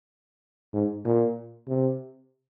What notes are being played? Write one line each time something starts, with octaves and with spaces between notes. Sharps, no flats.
G#2
A#2
C3